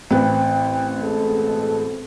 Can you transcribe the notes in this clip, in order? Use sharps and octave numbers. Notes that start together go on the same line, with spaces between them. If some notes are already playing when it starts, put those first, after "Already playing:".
A1 C4 B4 G5
B2 G#3 G#4 A4